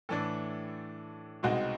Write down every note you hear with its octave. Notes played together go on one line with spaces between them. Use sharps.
A2 E3 A3 D4 A4
C2 B2 G#3 C4 D#4 F#4